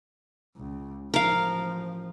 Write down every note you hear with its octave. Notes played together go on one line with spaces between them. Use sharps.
C#2
A1 F3 A#4 F5